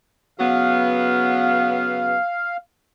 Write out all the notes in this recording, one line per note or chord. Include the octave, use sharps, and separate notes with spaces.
C#3 F#3 B3 F5